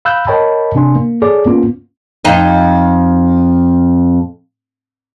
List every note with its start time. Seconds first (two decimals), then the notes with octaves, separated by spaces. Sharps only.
0.05 F5 B5 E6 F#6 G6
0.27 A#4 C#5 D#5 G5 A5 B5
0.75 C3 D4 G#5 C6
0.95 A#3
1.22 G#4 A4 C#5 D5 D6
1.46 A#3 B3 C#4 F4
2.25 F2 D#4